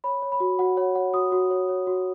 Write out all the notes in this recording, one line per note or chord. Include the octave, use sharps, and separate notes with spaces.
C#5 B5
C#5
B5
F#4
F#4 F#5
C#5 F#5
C#5 F#5
F#4 D#6
F#4
C#5
C#5
F#4